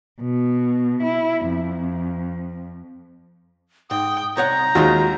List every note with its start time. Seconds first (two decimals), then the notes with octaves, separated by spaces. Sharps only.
0.21 B2
1.03 E4
1.46 F2
3.91 G#2 G5 D#6
4.37 C2 C#5 F#5 A#5 G6
4.75 D#2 G#3 F4 F#4